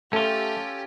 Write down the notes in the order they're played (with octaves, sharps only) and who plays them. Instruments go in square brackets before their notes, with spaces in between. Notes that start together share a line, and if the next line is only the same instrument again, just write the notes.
[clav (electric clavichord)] A3 [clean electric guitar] C#4 F4 [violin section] G4 [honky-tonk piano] A4